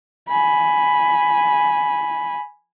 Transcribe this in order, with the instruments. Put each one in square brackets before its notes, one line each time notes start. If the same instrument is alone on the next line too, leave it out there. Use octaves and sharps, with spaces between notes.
[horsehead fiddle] G#5 B5